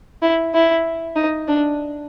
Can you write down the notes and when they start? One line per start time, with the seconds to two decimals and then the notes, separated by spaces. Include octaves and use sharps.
0.22 E4
0.54 E4
1.16 D#4
1.48 D4